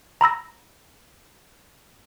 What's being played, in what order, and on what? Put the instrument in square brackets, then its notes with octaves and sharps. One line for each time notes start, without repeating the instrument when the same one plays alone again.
[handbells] A#5 B5 E6 A#6